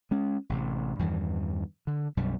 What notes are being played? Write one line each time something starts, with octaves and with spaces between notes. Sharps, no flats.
G#3 C#4
A1 C3
E2 G2 D#3 E3
D3
B1 F#2 B2 G3